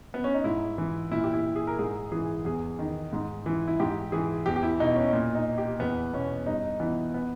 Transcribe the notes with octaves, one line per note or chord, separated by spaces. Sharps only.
B3
C#4
D#4
G#2 E4
E3
A#2 E4
G4
E4
G#4
A#4
G#2 G#4
E3 G#4
E2 G#4
D#3
G#2
E3
E4
G#2 G4
E3 G#4
E2 G4
G4
E4
B2 D#4
C#4
A#2
D#4
G4
E2 B3
B2 C#4
G2 D#4
E3 B3
B3